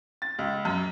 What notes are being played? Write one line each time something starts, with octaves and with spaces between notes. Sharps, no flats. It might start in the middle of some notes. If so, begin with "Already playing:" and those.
A6
C#2
F#2